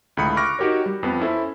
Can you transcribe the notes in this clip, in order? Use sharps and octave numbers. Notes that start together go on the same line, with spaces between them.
C#2 A2 D3 B5 D#6 C#7
C#6 D6 F6 F#6 A#6 D7
D#4 F#4 G4 A#4 C#5
G3
F2 B3
C#4 E4 A4 C5